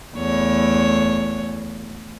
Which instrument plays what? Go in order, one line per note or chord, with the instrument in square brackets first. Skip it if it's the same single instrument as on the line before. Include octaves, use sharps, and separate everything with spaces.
[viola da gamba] E2 A3 C#5